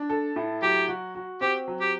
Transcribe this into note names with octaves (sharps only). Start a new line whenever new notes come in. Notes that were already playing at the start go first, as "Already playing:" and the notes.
Already playing: D4
A4
A2
F#3 G4
F#4
F#4
C4 G4
F#3
G4